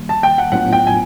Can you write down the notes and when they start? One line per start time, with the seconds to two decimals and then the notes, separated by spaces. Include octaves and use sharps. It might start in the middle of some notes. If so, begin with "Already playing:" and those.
Already playing: D#3 G3 A#3
0.09 A5
0.23 G5
0.38 F#5
0.52 A2 F#3 B3 D4 F4 F#5
0.73 G5
0.87 G#5